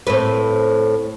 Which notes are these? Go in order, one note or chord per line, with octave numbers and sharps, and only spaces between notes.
A2 C4 B4